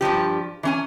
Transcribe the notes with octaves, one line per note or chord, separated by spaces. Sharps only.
G2 C3 F3 G4
E3 C#4 G#5